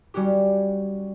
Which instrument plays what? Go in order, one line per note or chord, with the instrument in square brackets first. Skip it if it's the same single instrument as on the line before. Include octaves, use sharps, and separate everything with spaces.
[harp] G3 C#4 F#4 G4